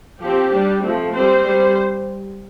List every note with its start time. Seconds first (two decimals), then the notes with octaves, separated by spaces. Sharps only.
0.20 F3 C4 G4
0.51 G3 D4
0.82 F3 A3 C4
1.14 G3 C4 C5
1.45 G3